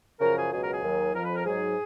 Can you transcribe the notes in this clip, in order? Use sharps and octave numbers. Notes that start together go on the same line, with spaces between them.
F#2 C#3 F3 A#4
G#4
C#2 B2 F#3 G#4
A#4
G#4
D#2 D#3 F#3
F2 F3 A#4
B4
A#4
G#2 F#3 G#4